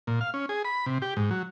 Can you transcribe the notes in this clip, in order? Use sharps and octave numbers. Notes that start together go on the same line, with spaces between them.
A#2
F5
C#4
G#4
B5
C3
G4
G#2
F#3